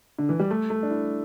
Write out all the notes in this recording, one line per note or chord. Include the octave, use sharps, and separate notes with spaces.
D3
E3
G3
A3
A3
D4
E4